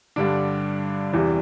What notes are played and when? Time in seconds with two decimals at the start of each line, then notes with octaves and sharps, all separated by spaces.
0.16 G2 D3 G3 D4
1.13 E2 C3 E3 G3